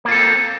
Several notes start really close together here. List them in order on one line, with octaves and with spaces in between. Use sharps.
A#3 F4 A4 C4